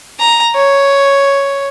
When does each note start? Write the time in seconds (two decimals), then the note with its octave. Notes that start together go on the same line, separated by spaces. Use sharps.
0.20 A#5
0.55 C#5